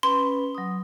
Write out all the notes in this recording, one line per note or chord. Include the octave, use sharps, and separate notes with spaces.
C#4 B4 B5 C6
F#3 D#6